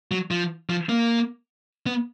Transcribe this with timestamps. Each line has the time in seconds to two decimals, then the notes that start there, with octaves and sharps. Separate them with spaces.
0.11 F#3
0.31 F3
0.70 F3
0.89 A#3
1.86 B3